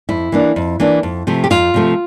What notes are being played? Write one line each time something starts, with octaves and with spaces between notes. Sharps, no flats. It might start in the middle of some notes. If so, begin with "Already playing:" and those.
F2 E4
E3 A#3 D4
F2
E3 A#3 D4
F2
C3 F3 A3
G4
F2 F4
C3 F3 A3